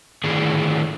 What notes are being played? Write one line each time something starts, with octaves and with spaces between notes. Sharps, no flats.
A2 D3 D#3 D4 G#4